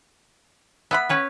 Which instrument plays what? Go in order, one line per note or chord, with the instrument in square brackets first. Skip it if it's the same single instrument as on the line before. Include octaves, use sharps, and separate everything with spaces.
[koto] B3 [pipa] E5 F#5 B5
[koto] C#4 B4 C#5